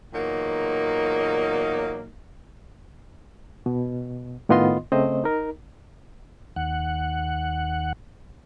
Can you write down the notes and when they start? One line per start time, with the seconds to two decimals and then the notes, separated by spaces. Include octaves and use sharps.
0.12 E2 A#2 F#3 A#3 D#4
3.66 B2
4.49 A2 D#3 B3 F4 D#5 C6
4.92 C#3 A3 C4 C5 D#5
5.24 D#4 A#4
6.56 D#2 F#5